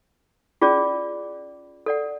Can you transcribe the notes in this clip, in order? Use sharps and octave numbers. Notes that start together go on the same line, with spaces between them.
C#4 F4 G#4 D5
A4 D5 F#5